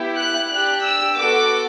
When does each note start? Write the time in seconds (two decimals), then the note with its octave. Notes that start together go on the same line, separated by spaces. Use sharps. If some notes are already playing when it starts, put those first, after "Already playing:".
Already playing: B3 E4 G4
0.17 F#6
0.50 D4 G4 F#6
0.83 E6
1.17 B3 F#4 A4 D6